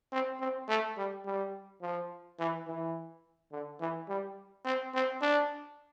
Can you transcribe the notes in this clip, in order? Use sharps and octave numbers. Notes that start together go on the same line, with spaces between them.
C4
C4
A3
G3
G3
F3
E3
E3
D3
E3
G3
C4
C4
D4